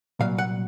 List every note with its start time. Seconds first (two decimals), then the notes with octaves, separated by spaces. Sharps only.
0.20 C2 A#2 F#3 F5
0.38 F#5